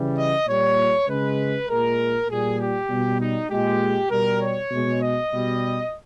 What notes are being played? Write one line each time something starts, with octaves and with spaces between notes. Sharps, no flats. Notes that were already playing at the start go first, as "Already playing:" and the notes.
Already playing: C#3 E3 G3
D#5
A#2 G3 C#5
C#3 G#3 B4
A#2 G#3 A#4
A#2 G3 G#4
G4
B2 G3
D#4
A#2 G#3 G4
B2 G3 A#4
C#5
B2 G#3
D#5
B2 G3